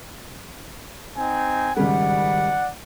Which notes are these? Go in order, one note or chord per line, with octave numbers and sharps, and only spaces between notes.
C4 D#4 G#5
G#1 C#3 G3 D5 F#5